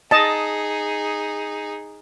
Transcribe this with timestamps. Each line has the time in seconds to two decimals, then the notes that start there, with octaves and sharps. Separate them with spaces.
0.11 D#4 G#4 D#5 A5